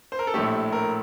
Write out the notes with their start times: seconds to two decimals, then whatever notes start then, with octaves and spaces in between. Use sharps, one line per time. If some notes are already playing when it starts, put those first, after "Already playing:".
0.12 C5
0.19 A#4
0.27 A4
0.34 A#1 A2 A3 G4
0.72 A#4